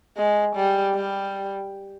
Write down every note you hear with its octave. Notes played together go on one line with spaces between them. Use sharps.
G#3
G3
G3